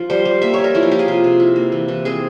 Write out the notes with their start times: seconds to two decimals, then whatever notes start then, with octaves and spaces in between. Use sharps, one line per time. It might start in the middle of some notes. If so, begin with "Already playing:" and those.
Already playing: F3 F4
0.10 G3 C5
0.25 G3
0.42 A#3 E5
0.54 C#5
0.59 G3
0.64 A#4
0.75 F3 E4
0.83 F4
0.91 A#3 G4
0.99 G#4
1.08 C3 F4
1.24 C3
1.40 E4
1.56 A#3
1.72 E3
1.88 E3
2.05 C4 G#4